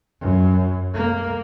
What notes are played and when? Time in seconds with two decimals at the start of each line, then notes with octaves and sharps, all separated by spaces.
0.21 F#2
0.94 A#3